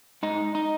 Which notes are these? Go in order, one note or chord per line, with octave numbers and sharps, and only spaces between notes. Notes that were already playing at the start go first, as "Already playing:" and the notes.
G#2 D#4
D#4